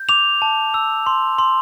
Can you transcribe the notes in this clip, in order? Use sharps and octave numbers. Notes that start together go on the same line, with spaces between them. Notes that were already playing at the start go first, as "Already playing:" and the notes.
Already playing: G6
D6 F7
A5
E6
C6
C6